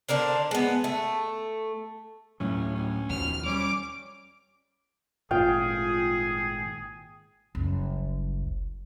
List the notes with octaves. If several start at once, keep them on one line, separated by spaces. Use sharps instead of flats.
D3 D4 A#4 C5
G#3 B3
A3
D2 A2 F#3 C#4
C#4
D#2 B2 F3 F6
G3 C#4 D6
G#1 A#2 F4 G#4 G5
F#1 C2